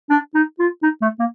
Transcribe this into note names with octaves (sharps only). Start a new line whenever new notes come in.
D4
D#4
F4
D#4
A3
A#3